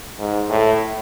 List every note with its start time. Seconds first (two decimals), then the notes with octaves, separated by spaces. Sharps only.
0.18 G#2
0.49 A2